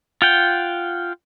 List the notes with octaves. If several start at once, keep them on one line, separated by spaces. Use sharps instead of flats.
F4 F#5 G5